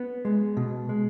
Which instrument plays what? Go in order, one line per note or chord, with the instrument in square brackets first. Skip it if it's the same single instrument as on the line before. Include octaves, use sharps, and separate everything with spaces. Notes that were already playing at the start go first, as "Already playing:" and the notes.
Already playing: [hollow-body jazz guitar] B3
G#3
B2
G#3